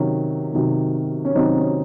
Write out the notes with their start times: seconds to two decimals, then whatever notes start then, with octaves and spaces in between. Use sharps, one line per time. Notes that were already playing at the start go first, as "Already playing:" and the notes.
Already playing: C3 D#3 F#3 C#4
0.53 C3 D#3 F#3
1.25 C#4
1.35 C3 D#3 F#3 C4 D#4
1.55 C#4